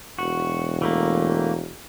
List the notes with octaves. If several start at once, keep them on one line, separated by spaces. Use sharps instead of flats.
E1 F#4
E3 A3 A#3